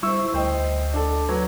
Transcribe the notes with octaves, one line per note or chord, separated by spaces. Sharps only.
G3 E4 C5 C#6 E6
D2 C5 D#5 G5
D4 A4
F#3 B4 G#6